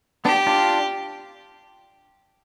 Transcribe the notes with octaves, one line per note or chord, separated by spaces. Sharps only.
B3 D4 G4
D4 F4